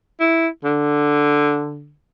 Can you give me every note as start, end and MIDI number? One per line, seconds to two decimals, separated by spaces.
0.20 0.48 64
0.64 1.94 50